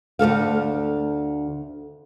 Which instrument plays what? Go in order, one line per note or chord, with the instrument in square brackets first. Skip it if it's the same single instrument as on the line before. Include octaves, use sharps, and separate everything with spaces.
[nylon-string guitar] D2 G#2 A4 F5